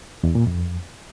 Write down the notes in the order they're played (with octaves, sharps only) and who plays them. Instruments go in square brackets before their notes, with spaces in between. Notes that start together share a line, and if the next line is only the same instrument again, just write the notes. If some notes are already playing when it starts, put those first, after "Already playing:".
[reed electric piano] E2
A#2
F2